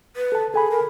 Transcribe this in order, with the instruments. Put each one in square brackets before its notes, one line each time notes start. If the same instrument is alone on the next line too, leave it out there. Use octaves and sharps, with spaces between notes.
[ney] B4
[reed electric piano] A4 A5
[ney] G#4 [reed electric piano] A4 G#5 B5
[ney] A#4